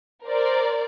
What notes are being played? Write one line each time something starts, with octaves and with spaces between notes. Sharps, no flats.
A#4 C5 D5